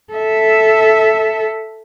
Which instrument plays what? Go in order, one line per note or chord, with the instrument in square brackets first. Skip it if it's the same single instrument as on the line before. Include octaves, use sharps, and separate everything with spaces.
[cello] A4 E5